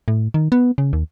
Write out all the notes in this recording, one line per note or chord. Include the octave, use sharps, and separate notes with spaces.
A2
D#3
B3
C#3
D#2